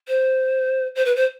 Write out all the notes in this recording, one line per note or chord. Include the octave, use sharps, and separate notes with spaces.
C5
C5
B4
C5